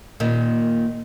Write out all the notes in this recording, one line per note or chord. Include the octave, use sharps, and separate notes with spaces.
A#2 D#3